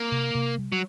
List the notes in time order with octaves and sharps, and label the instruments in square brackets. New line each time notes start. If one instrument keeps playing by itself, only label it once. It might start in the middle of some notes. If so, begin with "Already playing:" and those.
Already playing: [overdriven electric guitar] A#3
[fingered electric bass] C3
C3
G3
[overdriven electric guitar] F#3